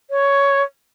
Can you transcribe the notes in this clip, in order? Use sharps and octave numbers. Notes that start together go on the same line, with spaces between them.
C#5